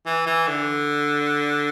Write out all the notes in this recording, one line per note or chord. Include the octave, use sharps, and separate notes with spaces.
E3
E3
D3